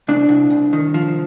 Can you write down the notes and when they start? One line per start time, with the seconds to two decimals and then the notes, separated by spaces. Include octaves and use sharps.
0.08 C2 D4
0.29 C2
0.50 C2
0.73 D#3
0.94 F3